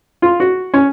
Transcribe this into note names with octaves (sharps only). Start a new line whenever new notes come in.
F4
F#4
C#4